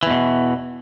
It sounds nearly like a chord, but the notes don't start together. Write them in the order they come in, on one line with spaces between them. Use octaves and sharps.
E3 E2 B2